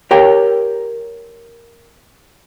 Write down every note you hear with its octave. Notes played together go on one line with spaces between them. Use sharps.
G4 A#4 C#5 G5